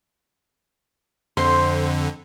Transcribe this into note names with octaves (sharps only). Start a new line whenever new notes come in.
F2 D3 C5 C6